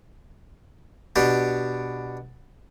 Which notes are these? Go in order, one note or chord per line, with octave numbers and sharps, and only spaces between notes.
B2 D4 G4